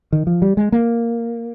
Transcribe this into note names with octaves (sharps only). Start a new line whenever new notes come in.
D#3
F3
G3
G#3
A#3